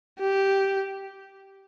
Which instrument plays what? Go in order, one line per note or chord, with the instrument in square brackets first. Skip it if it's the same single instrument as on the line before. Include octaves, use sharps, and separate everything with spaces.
[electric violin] G4